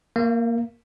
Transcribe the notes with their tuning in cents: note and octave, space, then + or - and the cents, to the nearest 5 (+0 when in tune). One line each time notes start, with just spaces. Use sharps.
A#3 +0 F5 -45